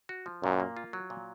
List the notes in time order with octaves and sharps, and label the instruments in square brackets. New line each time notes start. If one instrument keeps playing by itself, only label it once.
[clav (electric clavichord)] F#4
F3
[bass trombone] F#2 [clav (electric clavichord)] A#2
[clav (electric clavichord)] A#3
F4
F#3
A#2